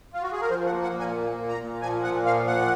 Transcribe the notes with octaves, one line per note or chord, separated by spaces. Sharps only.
F4
F#4
G#4
A#4
F3 C5
F#5
A#3
F#5
A#2
G#5
A#3
A#2
A#5
A#2
F3 G#5
A#2 F#5
F3 F5
A#2 F#5